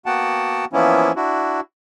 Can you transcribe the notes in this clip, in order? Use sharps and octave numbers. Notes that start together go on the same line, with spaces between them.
A#3 B3 F#4 F#5 G5 A5
E3 F3 A#3 B3 C#4 E4
D4 E4 F#4